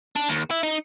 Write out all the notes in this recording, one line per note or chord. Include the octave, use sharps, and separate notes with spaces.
D4
D#2
E4
D#4